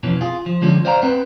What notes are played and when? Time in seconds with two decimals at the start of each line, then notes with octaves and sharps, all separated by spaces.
0.03 F2 B2 E3 C#4
0.21 F4 G#4
0.46 F3
0.62 D3 F3 G#3 C#4
0.85 C5 D5 F5 G5 A#5
1.02 B3 C4 B4